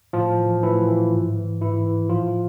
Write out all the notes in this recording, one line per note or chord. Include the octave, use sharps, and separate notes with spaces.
A2 F3 F4
E3
A2 E3 E4
E3
G#2
E3
G#2 E3 E4
E3
A2 F3 F4